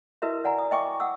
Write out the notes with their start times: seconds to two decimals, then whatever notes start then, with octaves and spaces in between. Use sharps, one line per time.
0.22 E4 F#4 A#4 B4 D#5 E5
0.44 D5 F#5 G#5 A#5
0.58 D#6
0.71 D#5 E5 G5 G#5 C#6 D6
1.00 F#5 D#6 E6